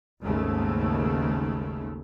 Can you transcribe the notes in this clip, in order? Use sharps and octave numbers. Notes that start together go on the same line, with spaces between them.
G#1 D#2 G#2 C#3 A3